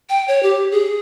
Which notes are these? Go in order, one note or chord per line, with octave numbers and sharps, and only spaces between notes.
G5
C#5
G4
G#4